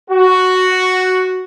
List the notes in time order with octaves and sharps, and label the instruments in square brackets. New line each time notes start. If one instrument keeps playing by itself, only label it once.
[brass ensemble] F#4